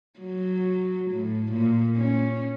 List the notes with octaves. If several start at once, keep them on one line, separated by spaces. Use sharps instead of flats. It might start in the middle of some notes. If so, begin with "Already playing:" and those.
F#3
A2
A#2
C#4